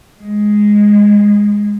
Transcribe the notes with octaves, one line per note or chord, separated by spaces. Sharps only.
G#3